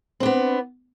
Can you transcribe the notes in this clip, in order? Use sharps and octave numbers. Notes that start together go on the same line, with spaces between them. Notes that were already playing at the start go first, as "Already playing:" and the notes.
B3 C4 D4